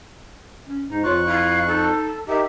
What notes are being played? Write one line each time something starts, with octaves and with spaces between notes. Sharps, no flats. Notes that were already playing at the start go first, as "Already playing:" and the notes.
C#4
G#2 D#4
F2 F4 C#5 C#6 F#6
E4 F5
D#4 A4
D#4 G4 A#4 E5